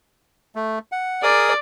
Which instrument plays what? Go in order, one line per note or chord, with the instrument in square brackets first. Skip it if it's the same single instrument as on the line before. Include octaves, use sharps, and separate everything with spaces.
[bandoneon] A3
F#5
[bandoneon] G#4 A#4 D#6 [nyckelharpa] D5